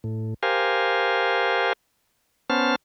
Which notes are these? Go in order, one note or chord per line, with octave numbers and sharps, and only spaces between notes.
A2
G4 A#4 C5 F5 G#5
B3 C#4 C5 A5 F6